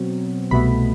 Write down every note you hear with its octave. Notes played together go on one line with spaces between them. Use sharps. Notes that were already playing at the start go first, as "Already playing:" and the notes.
Already playing: B2 F#3 C4
C2 B2 A3 B5